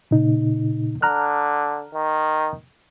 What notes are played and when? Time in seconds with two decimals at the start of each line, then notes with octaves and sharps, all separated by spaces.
0.11 A#2 C#3 D#4
1.02 D3 A#5 F6 F#6
1.94 D#3